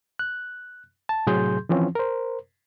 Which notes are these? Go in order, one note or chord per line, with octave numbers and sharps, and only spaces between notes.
F#6
A5
A2 C3 F#3 G#4 C6 G6
E3 F3 C4 C#4
A#4 C5